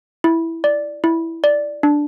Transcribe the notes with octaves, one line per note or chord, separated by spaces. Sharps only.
E4
D5
E4
D5
D4